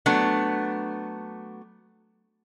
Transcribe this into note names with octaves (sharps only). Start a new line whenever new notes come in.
F#3 A3 B3 D4